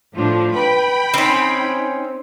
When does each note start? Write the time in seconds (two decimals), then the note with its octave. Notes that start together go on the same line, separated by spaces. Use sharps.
0.16 A2 F3 D4 F4
0.54 B4 G5 B5
1.14 C4 C#4 D#4